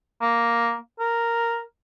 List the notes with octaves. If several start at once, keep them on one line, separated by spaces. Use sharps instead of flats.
A#3
A#4